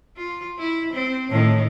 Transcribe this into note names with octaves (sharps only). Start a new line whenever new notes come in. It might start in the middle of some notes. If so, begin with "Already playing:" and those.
F4
E4
C4
A2 D#3 A3